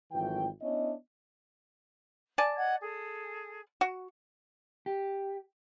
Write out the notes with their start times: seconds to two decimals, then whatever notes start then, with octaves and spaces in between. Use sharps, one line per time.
0.12 G#1 E3 F#3 A3 F4 G5
0.61 B3 C#4 D4 E4 C#5 D#5
2.38 D5 G#5 A5
2.56 D#5 F#5 G#6
2.81 G#4 A4
3.81 F#4
4.86 G4